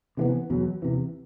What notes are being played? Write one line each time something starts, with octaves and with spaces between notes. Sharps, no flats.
C3 E3 G#3 B3
E2 B2 F#3
E2 C3 E3